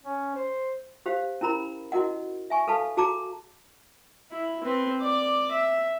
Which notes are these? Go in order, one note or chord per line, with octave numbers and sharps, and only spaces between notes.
C#4
C5
G4 C5 F5
C#4 E4 A#4 A#5 B5
E4 F#4 A#4 D#5 F#5
E5 G#5 C#6
A4 B4 F5 A5
F#4 G#4 A5 A#5 D6
E4
C4 B4
D5 D6
E5